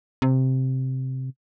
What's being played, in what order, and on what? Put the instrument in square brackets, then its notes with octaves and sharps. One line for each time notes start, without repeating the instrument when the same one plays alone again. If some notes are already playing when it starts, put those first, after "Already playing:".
[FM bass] C3